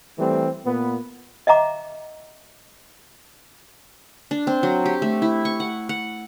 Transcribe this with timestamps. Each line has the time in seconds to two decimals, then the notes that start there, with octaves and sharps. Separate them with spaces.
0.19 E3 G3 A3 C4
0.65 A#2 B3
1.47 D#5 E5 F#5 A#5 D6
4.31 D4
4.47 C4
4.63 F#3
4.85 G4
5.02 A3
5.22 E4
5.45 C#6
5.60 F#5
5.89 F#5